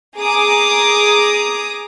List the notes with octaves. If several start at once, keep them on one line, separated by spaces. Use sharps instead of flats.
G#4 A#5 D6 D#6